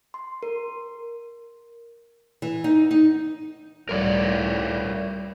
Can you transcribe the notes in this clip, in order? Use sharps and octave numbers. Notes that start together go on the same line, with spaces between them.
C6
A#4
E3
D#4
D#4
C#2 A2 G3 A#4 C#5 D5